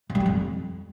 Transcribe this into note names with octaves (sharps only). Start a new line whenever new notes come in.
F#2
G3
E2
F2